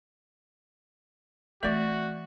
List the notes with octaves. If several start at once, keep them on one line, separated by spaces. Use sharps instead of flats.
E3 A3 C4 F#4 D5 E5